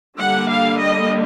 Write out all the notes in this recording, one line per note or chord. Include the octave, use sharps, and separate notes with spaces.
D3 G3 A#3 D4 F#5
F5
D#5